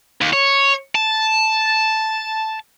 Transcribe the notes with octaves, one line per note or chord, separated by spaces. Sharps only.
D#2
C#5
A5